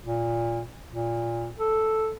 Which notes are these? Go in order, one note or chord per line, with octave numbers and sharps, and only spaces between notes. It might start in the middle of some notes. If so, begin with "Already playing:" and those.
A#2
A#2
A4